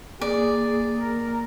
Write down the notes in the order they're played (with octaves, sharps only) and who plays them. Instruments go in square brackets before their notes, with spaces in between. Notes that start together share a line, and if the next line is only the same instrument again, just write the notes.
[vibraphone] A#3 [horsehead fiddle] G#4 [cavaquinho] D5
[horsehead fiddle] A#4